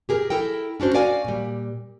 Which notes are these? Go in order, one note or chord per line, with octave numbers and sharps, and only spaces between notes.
G4 G#4 A#4
E4 A4 A#4 G5
C#4 D4 F#4 C5
F#4 A#4 D5 F5 G#5
A#2 G3